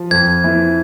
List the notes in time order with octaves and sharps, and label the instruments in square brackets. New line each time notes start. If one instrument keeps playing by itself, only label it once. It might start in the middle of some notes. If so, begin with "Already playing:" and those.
Already playing: [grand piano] F3
[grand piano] F2 [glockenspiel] G#6
[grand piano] E3